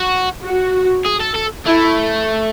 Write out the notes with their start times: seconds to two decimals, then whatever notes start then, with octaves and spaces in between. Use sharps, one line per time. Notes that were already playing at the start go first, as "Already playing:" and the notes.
Already playing: F#4
0.45 F#4
1.06 G#4
1.21 A4
1.36 A4
1.66 A3 E4